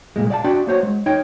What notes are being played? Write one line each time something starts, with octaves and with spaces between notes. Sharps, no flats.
C2 F2 A#2 G#3
D5 F5 F#5 A5
D4 F#4 D5 G5 C6
A#3 F#4 C5 C#5 F#5
G#3
D#4 C#5 D#5 G5